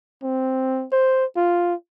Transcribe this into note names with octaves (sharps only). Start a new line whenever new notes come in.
C4
C5
F4